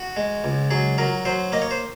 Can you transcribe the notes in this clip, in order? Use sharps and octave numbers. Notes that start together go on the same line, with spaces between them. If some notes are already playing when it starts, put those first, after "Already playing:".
Already playing: F#4
G#3
C#2
F#3 G#4
F#3 A#4
F#3 C5
A#3 D#5
C#5
C5